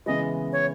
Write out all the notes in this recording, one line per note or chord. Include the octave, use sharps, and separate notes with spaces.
C#3 E3 G#3 B3 D#5
C#5